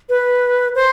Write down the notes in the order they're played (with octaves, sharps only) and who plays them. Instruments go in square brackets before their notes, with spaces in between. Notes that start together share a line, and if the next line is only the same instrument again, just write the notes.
[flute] B4
C5